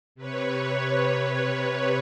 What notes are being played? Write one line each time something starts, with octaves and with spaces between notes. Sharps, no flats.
C3 B4 C#5